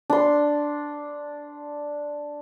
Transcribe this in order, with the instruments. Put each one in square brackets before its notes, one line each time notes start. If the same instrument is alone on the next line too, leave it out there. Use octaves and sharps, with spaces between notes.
[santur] D4 C6